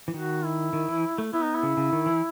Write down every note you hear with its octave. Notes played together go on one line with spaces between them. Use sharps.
E3
D#3 F#4
E4
D#3
E3
A3
B3 E4
D#4
E4
C#3
C#3
D#3
E3